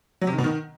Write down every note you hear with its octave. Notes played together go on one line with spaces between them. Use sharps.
F#3
C3
D#3
B2
D#3